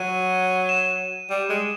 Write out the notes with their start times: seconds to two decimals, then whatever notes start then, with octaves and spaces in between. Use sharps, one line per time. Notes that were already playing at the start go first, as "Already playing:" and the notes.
Already playing: F#3 D#7
0.69 E7
1.30 G3
1.50 G#3